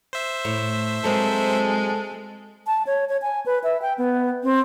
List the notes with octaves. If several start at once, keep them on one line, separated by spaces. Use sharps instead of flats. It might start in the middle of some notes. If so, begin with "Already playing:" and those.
C5 E5
A2
F#3 G#3 C4 A4 A#4
A5
C#5
C#5
G#5
B4
E5
G5
B3
C4